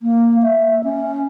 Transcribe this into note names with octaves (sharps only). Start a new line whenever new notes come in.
A#3
E5
C#4